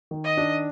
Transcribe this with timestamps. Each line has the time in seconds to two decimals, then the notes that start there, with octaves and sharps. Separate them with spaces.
0.11 D#3
0.24 D#5
0.37 D4